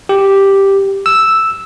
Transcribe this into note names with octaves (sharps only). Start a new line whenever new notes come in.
G4
E6